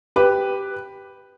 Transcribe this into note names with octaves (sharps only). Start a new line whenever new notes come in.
G4 B4